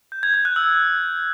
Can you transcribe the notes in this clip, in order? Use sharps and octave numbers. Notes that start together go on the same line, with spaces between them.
G6
G#6
G#6
F#6
E6